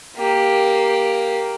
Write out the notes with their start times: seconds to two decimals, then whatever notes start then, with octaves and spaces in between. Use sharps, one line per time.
0.16 A#3 G4